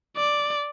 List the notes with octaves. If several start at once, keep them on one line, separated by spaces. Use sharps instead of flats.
D5